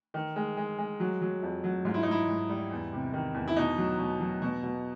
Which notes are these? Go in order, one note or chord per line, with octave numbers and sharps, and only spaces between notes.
D#3
G#3
G#3
G#3
F#3
F#3
F2
F#3
G#2 F4
E4
G#2 D#4
E4
G#2
G3
E2
C3
D#3
E2
E4
B2 D#4
F#3
B2
F#3
B2
B2